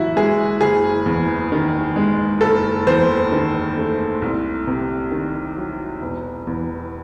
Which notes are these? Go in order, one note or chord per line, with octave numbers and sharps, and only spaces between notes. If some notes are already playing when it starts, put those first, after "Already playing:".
Already playing: F#1 F#2 E3 E4 F#4
G#3 G#4
F#1 G#4
E2
D#3
G#3
F#1 A4
E2 C5
D#3
A3
C2
C3
D#3
F#3
E1
E2